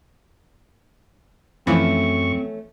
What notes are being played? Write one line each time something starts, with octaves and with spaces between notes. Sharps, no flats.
F#2 E3 F3 A3 C4 C#4 C#6